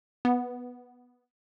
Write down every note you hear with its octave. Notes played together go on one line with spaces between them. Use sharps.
B3